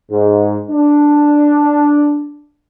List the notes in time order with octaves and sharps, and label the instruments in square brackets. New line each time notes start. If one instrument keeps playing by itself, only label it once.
[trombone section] G#2
D4